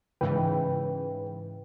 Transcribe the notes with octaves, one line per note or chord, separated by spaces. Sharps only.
G#2 C#3 E3 B4 G5